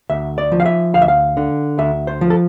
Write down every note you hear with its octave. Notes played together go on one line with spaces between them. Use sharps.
D2 E5
D5
F3
F5
E5
D2 F5
E5
F5
D3
D2 E5
C5
F3
A4